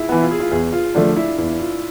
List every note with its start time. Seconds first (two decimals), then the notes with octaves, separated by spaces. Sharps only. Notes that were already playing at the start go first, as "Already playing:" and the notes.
Already playing: E4 F4 G#4
0.09 E3 B3
0.22 F4
0.31 G#4
0.40 F4
0.51 E2 G#4
0.73 F4
0.95 D3 F3 A3 D4
1.17 E4
1.38 E2 E4
1.59 F4